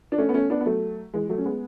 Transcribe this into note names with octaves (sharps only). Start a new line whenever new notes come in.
D4
A3 C#4
B3
A3 C#4
B3 D4
B3
F#3 A3
E3 G#3
F#3 A3
C#4
G#3 B3